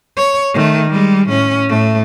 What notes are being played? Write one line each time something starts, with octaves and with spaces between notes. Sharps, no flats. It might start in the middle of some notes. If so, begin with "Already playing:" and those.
C#5
D#3 A3
G3 G#3
A2 C#4
A2 A3